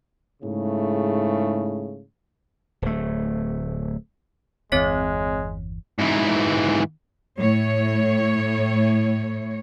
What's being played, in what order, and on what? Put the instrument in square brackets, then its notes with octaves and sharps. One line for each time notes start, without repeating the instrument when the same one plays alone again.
[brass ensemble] G#2 C#3 A3 E4
[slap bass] D1 A3
[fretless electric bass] G1 E2 E3 [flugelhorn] G#3 [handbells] C4 C#5 B6
[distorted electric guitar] G#2 E3
[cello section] A2 C#5